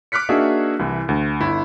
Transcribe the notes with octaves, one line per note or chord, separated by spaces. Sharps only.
D6 F6 F#6 B6 C#7
A#3 D4 D#4 F#4 G#4 E5
C2 E3
D2
G1 E4